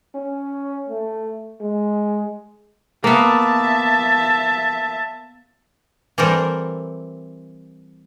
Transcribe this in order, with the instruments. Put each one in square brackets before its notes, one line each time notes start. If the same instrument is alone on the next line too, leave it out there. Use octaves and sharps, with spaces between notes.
[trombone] C#4
A3
G#3
[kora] A#3 B3 [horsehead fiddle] E5 A5
[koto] E3 G3 C4 A4 A#4